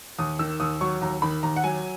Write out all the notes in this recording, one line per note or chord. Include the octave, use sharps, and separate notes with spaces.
D#2 D#6
D#3 E6
D#2 D#6
F#3 C#6
D#2 A#5
D#3 B5
D#2 A#5
F#5
F#3 G#5